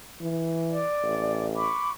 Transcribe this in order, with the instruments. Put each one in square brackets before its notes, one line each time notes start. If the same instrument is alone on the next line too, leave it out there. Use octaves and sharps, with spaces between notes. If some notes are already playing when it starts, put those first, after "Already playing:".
[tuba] E3
[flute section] D5
[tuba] A1
[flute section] B5 C#6 D6